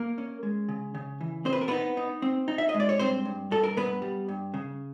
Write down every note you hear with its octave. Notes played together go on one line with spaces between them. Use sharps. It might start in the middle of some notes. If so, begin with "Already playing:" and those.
Already playing: A#3 A#4
C#4
G#3
C#3
C#3
E3
C4 C5
B4
A#4
B3 D#4 B4
D#4
C4
D#4
E5
D#5
G#3
D5
C#5
G2 C4 C5
G2
G2 A4
A#4
G2 B3 B4
G3
G2
C#3